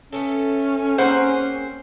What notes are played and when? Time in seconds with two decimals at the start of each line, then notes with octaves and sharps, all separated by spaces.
0.13 A3 B3 C#4 A4
0.98 A#3 C4 G#4 C5 F#5